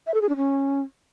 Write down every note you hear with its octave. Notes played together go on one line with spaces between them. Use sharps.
E5
A4
G#4
D4
C#4